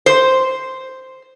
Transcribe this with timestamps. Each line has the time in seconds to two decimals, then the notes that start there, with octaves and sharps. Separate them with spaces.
0.06 C5